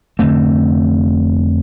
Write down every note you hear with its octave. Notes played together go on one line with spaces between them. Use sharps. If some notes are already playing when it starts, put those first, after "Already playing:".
F2 D3 A3 C4